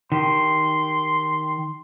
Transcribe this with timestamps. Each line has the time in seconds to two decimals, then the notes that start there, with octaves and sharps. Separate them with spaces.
0.12 D#3 G4 C6